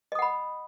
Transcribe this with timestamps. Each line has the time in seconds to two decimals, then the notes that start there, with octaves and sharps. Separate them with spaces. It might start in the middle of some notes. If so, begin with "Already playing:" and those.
0.12 D#5
0.15 D#6
0.19 F#5
0.22 B5